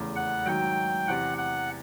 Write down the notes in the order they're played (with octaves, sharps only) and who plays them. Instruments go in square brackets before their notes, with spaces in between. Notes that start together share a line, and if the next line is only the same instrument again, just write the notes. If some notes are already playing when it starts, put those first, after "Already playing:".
Already playing: [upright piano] F1 E2 C#3
[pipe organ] F#5
[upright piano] G#2 D#3 F#3 [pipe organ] G5
[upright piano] E2 C3 E3 [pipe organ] F#5
[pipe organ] F#5